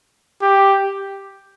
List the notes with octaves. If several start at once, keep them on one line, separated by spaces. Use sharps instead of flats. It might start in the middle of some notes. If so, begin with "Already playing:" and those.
G4